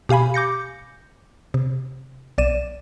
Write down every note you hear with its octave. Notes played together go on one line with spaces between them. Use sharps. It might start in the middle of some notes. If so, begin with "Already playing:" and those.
B2 G4 F5 G#5 B5
D6 G6 A#6 C#7
C3
B1 D5 D#7 E7